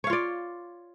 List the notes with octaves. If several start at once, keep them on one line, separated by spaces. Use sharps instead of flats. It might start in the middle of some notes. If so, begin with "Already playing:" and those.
F4 C#5 D5 F5